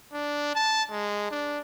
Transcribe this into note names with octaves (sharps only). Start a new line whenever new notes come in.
D4
A5
G#3
D4